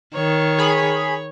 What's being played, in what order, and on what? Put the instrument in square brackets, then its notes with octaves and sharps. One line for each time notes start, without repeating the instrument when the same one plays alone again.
[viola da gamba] D#3 [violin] C#5
[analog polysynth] G#4 B5